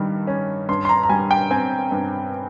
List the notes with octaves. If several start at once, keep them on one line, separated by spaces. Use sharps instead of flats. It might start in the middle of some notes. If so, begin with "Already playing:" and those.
Already playing: G2 D#3 G3
C#4
G2 C6
C6
A#5
A#5
G3 G#5
G5
C4 G#5
G2